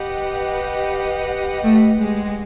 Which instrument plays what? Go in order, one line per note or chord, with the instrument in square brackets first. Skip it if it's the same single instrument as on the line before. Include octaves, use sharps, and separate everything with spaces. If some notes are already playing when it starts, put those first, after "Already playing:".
Already playing: [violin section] G4 B4 D#5 F#5
[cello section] A3
G#3